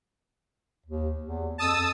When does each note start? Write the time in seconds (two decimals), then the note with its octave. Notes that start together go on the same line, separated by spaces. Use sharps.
0.86 D#2
1.23 E2
1.58 F2 A5 D#6 E6